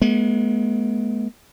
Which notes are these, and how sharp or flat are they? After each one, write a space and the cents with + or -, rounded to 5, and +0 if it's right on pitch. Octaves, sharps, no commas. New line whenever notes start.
G#3 +40 B3 -40